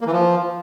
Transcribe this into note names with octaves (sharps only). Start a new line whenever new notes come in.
A#3
E3
F3